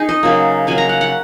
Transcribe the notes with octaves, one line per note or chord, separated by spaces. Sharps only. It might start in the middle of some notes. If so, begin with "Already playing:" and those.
Already playing: D#4 G#4
D#5
C#3 F#3 A#3
C#3 F#3 A#3 G#5
A#5
F#5
F#5